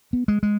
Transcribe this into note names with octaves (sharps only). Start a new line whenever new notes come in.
B3
G#3
G#3